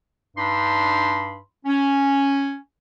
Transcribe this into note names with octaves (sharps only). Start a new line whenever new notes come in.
G2 D4 D#4 B5 C6
C#4